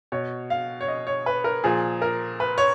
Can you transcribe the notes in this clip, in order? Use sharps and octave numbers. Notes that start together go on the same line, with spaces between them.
B2 C#5
F5
C#5
D#5
C#5
B4
A#4
A#2 F3 G#4
A#4
B4
C#5